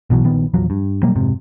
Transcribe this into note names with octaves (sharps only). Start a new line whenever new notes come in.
B1 B2 E3 F#3
A#1 D#3 B3
A#1 E2 F3 F#3
G2
B2 F#3 G3 A#3
F1 G#2 C3